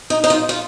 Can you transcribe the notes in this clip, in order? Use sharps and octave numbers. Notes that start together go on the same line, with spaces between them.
D#4
D#4
F4
F4